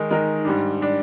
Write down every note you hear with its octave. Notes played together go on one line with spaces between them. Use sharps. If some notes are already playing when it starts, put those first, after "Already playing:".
Already playing: D#3 G#3 D#4 A#4
D#3 G#3 D#4 A#4
G#2 G3 D4
G3 D4